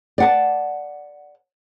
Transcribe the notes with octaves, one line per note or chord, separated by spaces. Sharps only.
D5 F#5 A5